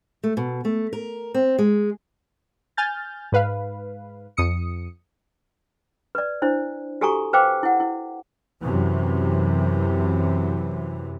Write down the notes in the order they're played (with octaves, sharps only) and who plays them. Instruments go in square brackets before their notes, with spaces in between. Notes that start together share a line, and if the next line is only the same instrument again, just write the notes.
[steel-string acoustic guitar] A3
B2
A3
A#4
C4
G#3
[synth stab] G#5 F6 G6 A6
G#2 B4 F5
F2 D#6 C#7
[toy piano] B4 D5
D4 E4 C5
F#4 G4 A4 G#5 A#5 C#6
B4 C5 F5 G5 D6
E4 F#5
E4
[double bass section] F#2 C3 E3